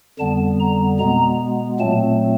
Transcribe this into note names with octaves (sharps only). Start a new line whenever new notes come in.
F2 D3 G3 B3 A5
A#5
B2 G#3 B3 A#5
A#2 F#3 A3 C4 A5